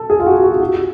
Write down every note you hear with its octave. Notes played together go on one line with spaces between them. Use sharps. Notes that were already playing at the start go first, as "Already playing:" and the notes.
Already playing: A4
G#4
F4
F#4
F#4
G4